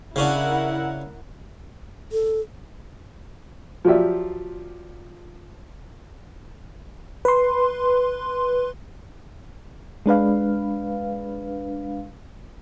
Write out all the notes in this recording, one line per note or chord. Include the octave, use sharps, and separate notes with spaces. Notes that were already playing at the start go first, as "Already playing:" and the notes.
C#3 C#4 D4 E4 A#4 F#5
A4
F3 F#3 F4 G4 D5 E5
B4 C6
G#3 D4 B4 F5